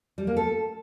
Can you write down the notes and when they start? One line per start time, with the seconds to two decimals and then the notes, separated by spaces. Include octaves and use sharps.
0.18 G3
0.27 A#3
0.37 A4